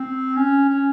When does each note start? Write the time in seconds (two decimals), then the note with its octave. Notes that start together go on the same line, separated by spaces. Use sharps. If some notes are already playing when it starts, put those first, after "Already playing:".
Already playing: C4
0.37 C#4
0.69 C#4